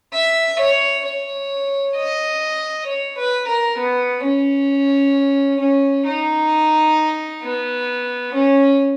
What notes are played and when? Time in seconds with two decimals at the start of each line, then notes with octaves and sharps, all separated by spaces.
0.13 E5
0.59 C#5
1.05 C#5
1.95 D#5
2.87 C#5
3.18 B4
3.47 A#4
3.78 B3
4.23 C#4
5.60 C#4
6.06 D#4
7.43 B3
8.34 C#4